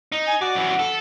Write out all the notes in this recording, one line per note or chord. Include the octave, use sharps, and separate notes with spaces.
D#4
G#5
F#4 D5
F#2 E3
A4